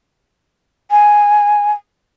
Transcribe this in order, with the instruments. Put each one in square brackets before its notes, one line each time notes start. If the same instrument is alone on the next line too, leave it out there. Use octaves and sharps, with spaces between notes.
[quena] G#5